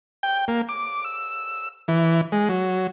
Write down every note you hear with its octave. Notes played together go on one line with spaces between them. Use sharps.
G5
A#3
D6
E6
E3
G#3
F#3